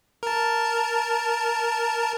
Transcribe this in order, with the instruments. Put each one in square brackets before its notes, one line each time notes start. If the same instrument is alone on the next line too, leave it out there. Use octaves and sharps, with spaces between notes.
[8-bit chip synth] A#4 A5